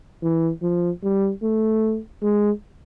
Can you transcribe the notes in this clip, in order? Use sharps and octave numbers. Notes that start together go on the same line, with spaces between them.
E3
F3
G3
A3
G#3